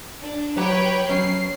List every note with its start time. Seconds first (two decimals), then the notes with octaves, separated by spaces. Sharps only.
0.20 D4
0.57 F#3 G4 B4 C#5 F#5 G5
1.09 F#3 C#4 C7